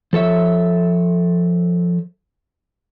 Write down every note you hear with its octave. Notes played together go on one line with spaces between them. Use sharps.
F3 A4 C#5 E5